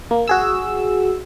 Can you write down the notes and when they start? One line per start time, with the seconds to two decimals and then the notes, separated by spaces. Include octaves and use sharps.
0.11 A#3
0.28 F#4 G#4 E6